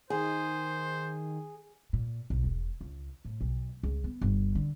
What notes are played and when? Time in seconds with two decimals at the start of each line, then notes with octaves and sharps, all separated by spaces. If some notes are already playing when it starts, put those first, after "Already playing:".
0.10 D#3 G#4 C5
1.93 A#2
2.30 B1
2.44 E1
2.81 C#2
3.25 A2
3.41 B1
3.83 C#2
4.04 B3
4.21 G1
4.55 D3